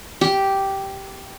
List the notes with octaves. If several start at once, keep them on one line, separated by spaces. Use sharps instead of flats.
G4